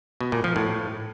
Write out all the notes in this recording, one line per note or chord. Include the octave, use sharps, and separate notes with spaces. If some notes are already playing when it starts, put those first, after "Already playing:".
B2
A#2
F3
A2